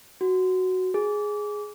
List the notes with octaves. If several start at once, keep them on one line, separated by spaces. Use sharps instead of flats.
F#4
G#4